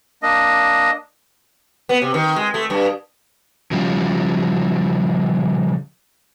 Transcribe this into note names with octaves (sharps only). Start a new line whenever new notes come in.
A#3 D4 D#5
B3
C3
D#3
G#3
A3
G2
C#3 F3 G3